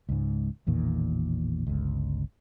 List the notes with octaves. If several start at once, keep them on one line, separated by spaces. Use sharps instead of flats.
C#2 G#2
A1 E2 A#2 D#3
G1 C#2